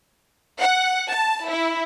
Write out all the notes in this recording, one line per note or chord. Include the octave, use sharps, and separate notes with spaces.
F#5
A5
E4